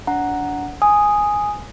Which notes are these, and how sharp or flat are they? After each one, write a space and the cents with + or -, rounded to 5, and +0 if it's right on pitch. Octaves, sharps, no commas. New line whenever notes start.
D4 -30 F#5 +0 A#5 +0
G#5 +0 D#6 +0